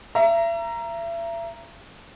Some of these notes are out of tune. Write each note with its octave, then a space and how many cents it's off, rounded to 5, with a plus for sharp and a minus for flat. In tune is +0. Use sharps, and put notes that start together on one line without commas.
E5 +35 A#5 +0